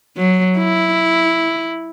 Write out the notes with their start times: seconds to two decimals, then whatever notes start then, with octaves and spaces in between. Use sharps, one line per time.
0.17 F#3
0.59 E4